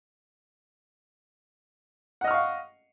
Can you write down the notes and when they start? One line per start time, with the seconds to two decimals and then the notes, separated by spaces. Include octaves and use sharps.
2.21 F#5
2.24 D#5
2.28 F6
2.31 C#6
2.34 F5